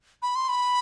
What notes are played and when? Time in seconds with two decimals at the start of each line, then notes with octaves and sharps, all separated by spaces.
0.22 B5
0.36 C6
0.49 B5